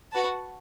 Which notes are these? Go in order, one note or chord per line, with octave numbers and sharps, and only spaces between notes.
F#4 B4 F#5 A5